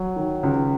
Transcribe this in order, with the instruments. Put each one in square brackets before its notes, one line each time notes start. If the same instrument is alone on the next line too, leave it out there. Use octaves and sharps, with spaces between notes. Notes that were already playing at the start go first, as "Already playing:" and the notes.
Already playing: [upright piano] F#3
D#3
C#2